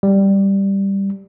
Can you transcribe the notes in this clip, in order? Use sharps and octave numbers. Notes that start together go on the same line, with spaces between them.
G3